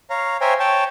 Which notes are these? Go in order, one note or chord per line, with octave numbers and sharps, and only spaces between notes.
C#5 F5 A#5
C5 C#5 E5 G5 G#5 A#5
C#5 G5 A5